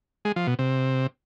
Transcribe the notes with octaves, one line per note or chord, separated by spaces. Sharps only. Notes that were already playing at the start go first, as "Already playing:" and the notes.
G#3
F3
B2
C3